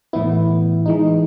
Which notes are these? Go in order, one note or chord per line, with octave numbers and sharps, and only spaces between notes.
A2 E3 B3 E4
E3 G#3 D#4